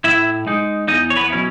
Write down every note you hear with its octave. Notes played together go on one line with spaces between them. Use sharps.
A2 E4 E5
G#3 D#4
E2 D#4 D#5
C#5
B3 B4
B2 F#3 C#4 E4